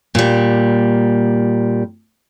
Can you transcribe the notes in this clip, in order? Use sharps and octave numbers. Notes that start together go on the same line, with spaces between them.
A#2 G3